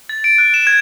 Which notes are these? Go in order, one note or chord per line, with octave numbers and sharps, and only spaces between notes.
A6
D7
F#6
E7
G#6